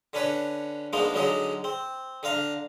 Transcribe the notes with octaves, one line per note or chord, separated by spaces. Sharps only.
D3 C#4 D4 B4 C#5
F3 G#3 A#3 B3 D4 D#4
D3 F#3 G#3 C#4 D#4 D5
C4
D3 D4 F5 A#5